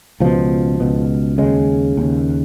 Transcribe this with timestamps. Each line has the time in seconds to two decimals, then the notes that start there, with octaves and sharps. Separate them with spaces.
0.20 C#2 B2 F3
0.80 C#2 B2
1.38 D#2 C#3 G#3
1.97 D#2 C#3